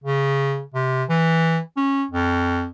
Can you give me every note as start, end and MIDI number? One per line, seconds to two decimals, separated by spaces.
0.04 0.62 49
0.74 1.04 48
1.09 1.60 52
1.77 2.05 61
2.11 2.67 41